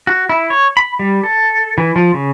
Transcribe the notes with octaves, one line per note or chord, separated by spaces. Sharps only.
F#4
E4
C#5
B5
G3
A4
E3
F3
C#3